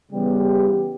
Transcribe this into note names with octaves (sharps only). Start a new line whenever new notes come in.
C#3 E3 G3 B3 G4